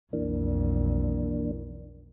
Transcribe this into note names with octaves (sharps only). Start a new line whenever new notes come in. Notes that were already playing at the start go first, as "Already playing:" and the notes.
B1 F2 E3 A#3 D4